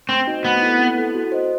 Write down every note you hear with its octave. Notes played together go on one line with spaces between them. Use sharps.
A3 C4
D#4 F#4 C5 D#5
A3 B3
E4 A4
C4
E4 A4
F#4
C5 D#5